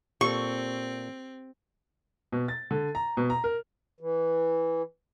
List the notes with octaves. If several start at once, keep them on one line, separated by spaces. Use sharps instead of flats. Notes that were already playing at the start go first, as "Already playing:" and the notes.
A#2 C4 G4 A4 C#6
B2
A6
D3
A#5
B2
A#5
A#4
E3